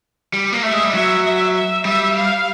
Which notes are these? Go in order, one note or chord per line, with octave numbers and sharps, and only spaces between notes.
G3
A#3
A3 E5
G#3
G3
F#3 E5
E5
E5
G3 E5
F5